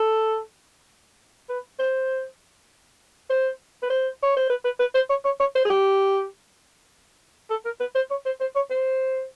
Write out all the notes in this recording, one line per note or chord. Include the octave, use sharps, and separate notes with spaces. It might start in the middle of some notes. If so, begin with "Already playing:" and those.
Already playing: A4
B4
C5
C5
B4
C5
C#5
C5
B4
B4
B4
C5
C#5
C#5
C#5
C5
G#4
G4
A4
A#4
B4
C5
C#5
C5
C5
C#5
C5